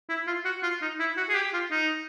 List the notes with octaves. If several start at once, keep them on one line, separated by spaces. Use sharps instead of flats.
E4
F4
F#4
F4
D#4
E4
F#4
G#4
G4
F4
D#4